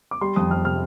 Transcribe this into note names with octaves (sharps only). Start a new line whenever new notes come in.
D6
G3 C6
F2 D#6
F2 F6
C3 F6